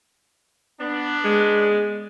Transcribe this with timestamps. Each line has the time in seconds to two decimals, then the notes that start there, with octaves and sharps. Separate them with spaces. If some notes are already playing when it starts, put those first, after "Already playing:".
0.79 B3 D4
1.25 G#3